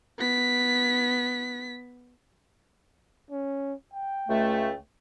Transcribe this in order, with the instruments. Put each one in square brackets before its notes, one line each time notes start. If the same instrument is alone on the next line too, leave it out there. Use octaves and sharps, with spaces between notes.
[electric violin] B3 B6
[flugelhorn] C#4
G5
[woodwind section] C#2 A3